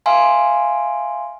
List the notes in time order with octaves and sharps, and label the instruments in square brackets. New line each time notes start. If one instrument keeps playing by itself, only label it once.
[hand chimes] E5 F5 G#5 C6